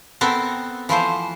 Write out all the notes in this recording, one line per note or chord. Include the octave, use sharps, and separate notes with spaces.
B3 C4 A4 A#4
E3 F3 A3 C5